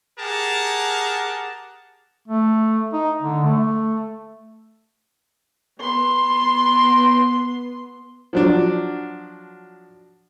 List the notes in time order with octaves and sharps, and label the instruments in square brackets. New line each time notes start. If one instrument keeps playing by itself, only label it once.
[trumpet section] G4 G#4 A#4 F#5 A5
[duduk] A3
D#4
D3
A3
[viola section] B3 C6
[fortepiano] F3 F#3 D4